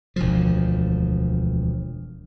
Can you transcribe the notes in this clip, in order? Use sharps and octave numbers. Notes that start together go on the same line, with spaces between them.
E1 D2 F3